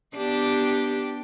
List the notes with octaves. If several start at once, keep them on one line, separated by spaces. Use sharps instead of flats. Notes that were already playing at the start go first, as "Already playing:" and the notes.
B3 D4 G4